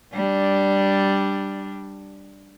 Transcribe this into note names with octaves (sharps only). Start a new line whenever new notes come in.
G3 D4